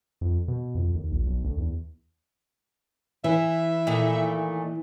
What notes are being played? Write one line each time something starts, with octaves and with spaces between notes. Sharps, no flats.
F2
B2
F2
D#2
A#1
B1
D2
E2
E3 E5
A#2 D#3 A3